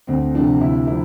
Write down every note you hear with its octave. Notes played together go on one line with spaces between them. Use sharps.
D2 C4
C3 F3 D4
D2 E4
C3 F3 E4